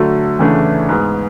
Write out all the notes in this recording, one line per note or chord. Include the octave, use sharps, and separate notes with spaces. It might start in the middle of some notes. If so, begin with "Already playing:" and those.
Already playing: D3 F#3 A3
E2 C#3 E3 A3 D4
G#2 G#3 B3